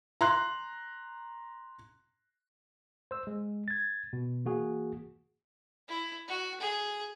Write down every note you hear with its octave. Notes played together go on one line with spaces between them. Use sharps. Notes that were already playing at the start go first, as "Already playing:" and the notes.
A#5 C6 F#6
C5 E6
G#3
G#6 A6
B2
E3 A#3 F#4 G#4
E4
F#4
G#4